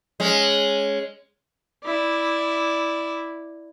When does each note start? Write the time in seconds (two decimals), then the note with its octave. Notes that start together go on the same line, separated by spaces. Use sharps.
0.20 G#3 C#4
1.84 E4 D5